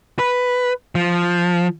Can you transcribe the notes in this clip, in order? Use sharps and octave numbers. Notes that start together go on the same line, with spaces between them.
B4
F3